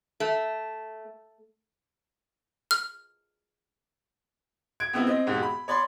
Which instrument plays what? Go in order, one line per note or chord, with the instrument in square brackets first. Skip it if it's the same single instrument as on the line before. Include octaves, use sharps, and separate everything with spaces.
[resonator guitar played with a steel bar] A3
[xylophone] F6
[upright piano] G#6 D7
C#2 B3 C4 E4
C4 D#5
E1 G#2 G4
B5
C#5 D5 B5 C6